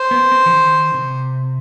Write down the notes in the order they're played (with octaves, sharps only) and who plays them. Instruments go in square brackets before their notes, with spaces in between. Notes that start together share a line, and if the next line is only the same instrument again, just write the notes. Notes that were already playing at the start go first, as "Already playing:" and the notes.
Already playing: [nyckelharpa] C5
[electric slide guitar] B3
C4
E3
D#3
C3